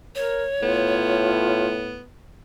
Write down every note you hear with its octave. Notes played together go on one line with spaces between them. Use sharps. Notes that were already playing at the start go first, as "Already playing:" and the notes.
A#4 C#5
A2 B3 F4